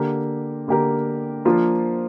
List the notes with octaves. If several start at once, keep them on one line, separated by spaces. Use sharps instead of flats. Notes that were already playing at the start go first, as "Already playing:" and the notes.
Already playing: D3 A#3 G4 A#4
D3 A#3 G4 A#4
F3 A#3 D4 F4